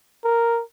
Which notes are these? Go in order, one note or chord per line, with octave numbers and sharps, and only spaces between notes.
A#4